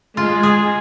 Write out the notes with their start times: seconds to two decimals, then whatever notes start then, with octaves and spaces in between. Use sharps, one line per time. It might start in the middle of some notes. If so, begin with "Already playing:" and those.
0.17 G#3 F4
0.43 G#4